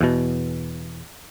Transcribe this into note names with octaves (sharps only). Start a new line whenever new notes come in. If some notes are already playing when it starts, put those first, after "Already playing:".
E2 B2